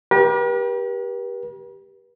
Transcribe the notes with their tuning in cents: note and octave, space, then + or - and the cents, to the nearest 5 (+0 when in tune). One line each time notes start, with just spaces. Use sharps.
G4 +0 B4 -45